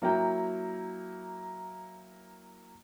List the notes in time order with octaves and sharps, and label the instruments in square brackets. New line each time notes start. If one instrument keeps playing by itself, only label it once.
[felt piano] F#3 A#3 E4 G5